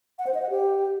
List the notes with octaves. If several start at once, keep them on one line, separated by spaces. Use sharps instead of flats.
F#5
C5
D#5
F#5
G4